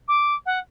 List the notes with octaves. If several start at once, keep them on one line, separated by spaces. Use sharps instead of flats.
D6
F#5